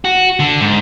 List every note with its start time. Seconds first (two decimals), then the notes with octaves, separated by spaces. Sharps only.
0.05 F#4
0.40 D3
0.61 G#2